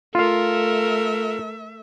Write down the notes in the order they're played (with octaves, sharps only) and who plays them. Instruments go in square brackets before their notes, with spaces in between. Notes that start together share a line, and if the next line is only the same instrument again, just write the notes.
[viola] A3 E5 [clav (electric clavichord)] F4 F5 [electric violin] A4 A#4